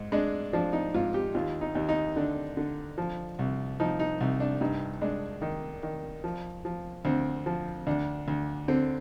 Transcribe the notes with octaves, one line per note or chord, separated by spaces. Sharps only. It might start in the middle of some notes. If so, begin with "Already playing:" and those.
Already playing: G#2
G#3 D4
F3 D4
D#4
G#2 F4
G4
D#2 F4
D#4
D#2
D#4
D3 D4
D3
F3
C2
F3 D#4
D#4
C2
D4
G2 D#4
G#3 D4
D#3
D#3
F3
F3
D2 C4
F3
D2 D4
D2
D3 C4